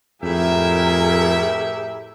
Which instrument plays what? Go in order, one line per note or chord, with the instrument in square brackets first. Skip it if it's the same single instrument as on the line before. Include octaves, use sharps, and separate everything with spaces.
[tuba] F2 [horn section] A2 G4 E5 [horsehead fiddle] G#4 A#4